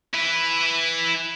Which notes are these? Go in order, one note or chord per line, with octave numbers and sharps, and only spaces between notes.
E4 B4